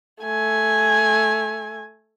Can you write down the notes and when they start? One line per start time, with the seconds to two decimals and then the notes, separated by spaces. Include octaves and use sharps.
0.23 A3 G#5